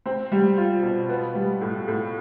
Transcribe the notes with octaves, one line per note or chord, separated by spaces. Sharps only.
C4
G3
F4
B2
B3
G3
A2
A2